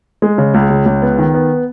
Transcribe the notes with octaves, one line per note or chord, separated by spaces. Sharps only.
G#3
C#3
C#2
C#3
C#2
B3
D#3
B3